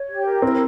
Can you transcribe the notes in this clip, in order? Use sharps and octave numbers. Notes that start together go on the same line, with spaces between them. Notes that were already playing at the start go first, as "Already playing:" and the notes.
Already playing: C#5
G4
A#4
C4 E4